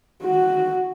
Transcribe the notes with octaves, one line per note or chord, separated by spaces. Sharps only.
F#4